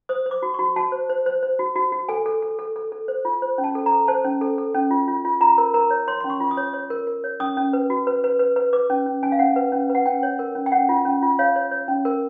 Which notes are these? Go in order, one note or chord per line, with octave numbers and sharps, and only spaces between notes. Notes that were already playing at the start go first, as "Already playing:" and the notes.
C5 D#6
C5
D6
F#4
C#6
F#4
F#4 A5
C5
C5
C5
C5
F#4
F#4
F#4
A4 G#5
A4
A4
A4
A4
A4
C5
F4
C5
C#4
A5
A4
A#5
A4
C5 A5
C#4
A4
A4
C#4
F4
F4
F4
F4 A#5
A#4
A#4 A#5
C#5
C#5 C6
C6
C#4
C#6
F4
D#6
C#5
C#5
A#4
A#4
C#5
C#4 D#6
C#4
B4
F#4
B4
B4
B4
B4
B4 D6
C#4
C#4
C#4 G#5
F5
C#4 F#5
B4
C#4
B4
F#5
C#4 G5
C#5
A#4
C#4
G5
C#4 F#5
F4
C#4
F4
C#5 F5
C#5
C#5
C#4
A#4